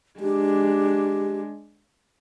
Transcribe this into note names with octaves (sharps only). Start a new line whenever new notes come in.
G#3 D4 G4